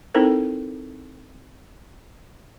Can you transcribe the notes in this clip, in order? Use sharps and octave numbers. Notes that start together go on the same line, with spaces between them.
C4 D#4 E4 A4 A#4 C5